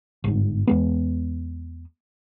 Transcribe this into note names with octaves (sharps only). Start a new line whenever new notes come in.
G1 G#2
E2 G#3 B3